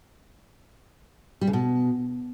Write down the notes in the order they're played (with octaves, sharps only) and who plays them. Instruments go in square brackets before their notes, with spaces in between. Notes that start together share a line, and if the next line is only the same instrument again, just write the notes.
[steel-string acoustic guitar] G3
C#3
B2